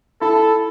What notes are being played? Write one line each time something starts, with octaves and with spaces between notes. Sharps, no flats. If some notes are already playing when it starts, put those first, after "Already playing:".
E4 A4